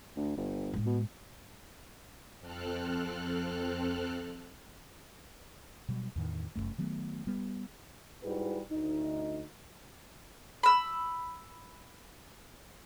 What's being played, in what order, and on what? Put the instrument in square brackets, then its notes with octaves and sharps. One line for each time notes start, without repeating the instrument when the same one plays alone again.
[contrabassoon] D2
G1
[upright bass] A2 G#3
[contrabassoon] B2
[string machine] F2 C4 A4 F6 F#6
[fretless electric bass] B2 F#3 G3
E2 A2 D#3
F1 C#2 F#2 A3
D#3 F#3 A3 B3
G3 B3
[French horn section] G#2 G3 E4 F#4 G#4 B4
D2 D#4
[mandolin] B5 E6